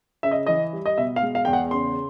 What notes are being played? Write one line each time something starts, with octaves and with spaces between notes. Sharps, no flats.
C#3 E5
D#5
E3 D#5
G3
D#5
B2 E5
F5
G#3
F5
E2 G5
F#5
C#3 C6